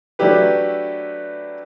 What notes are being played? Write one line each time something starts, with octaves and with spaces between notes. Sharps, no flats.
F#3 A3 D4 E4 G4 B4